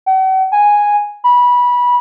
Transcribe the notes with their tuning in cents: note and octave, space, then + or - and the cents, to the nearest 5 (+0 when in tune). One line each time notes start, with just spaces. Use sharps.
F#5 +45
G#5 -5
B5 -20